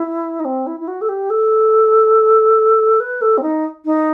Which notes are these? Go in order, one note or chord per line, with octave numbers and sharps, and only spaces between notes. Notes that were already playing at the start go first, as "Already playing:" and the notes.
Already playing: E4
D#4
C4
E4
E4
F#4
A4
G4
A4
B4
A4
C4
D#4
D#4